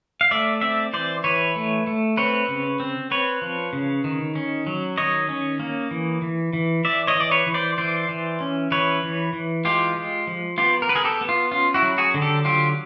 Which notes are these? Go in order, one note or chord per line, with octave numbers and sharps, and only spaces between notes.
F5
A3 D5 E5
C4 D5 E5
E3 C5 D5
E3 B4 C#5
A3
A3
C4 B4 C#5
C#3
C4
C4 B4 C#5
F3
C#3
D#3
C#4
F#3
D#3 C#5 D#5
C#4
A#3
E3
E3
E3
E3 D5 E5
C#5 D#5
E3 D5
B4 C#5
E3
C5 D5
E3 C5 D5
E3
C#4
E3 B4 C#5
E3
E3
G#3 F4 G4
G#3
F3
B3 F4 G4
A#4
B3 B4
G#4 A#4
G4 A4
B3
F4
C#4 F4
E4 F#4
F#3
F#4 G#4
D3
G4 A4
F#3 F4 G4